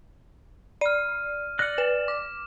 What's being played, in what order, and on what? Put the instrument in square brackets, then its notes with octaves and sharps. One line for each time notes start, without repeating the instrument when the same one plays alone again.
[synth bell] D5 [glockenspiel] F6 D#7
[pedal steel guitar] D5 F#6 [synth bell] A#6 C#7
[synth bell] B4 [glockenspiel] E7
[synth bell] D6